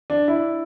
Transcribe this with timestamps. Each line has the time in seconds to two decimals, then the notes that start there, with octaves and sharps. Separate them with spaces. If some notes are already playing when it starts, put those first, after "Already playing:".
0.10 D4
0.28 E4